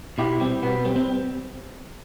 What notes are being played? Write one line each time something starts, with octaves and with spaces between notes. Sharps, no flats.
B2 E4 G4
G3 C4
B2 B3
G3 C4
C4